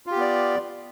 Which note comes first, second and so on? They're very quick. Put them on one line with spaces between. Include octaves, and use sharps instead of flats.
F4 G4 B3 D5